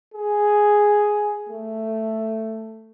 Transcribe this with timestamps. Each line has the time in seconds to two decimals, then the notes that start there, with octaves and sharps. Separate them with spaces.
0.14 G#4
1.49 A3